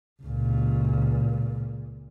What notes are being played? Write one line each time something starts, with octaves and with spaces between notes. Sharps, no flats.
C#2 A#2